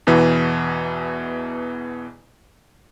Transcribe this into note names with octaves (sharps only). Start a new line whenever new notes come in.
E2 B2 E3